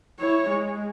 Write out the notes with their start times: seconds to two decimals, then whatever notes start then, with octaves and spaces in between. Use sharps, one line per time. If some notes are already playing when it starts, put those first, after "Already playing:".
0.19 E4 C#5
0.49 G#3